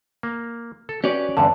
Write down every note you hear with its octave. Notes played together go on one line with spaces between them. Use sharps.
A#3
A4
C#4 F#4 G4 B4 C#5 D5
E2 G2 D3 A5